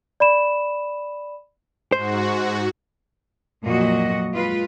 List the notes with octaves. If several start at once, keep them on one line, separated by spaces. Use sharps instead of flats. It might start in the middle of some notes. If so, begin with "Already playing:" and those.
D5 B5 E7
G#2 F#4 C5
F2 A#2 F#3 F#4 D#5
G#3 F4 B4